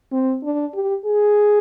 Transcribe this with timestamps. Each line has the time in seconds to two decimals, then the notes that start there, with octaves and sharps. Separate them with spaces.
0.12 C4
0.44 D4
0.75 G4
1.06 G#4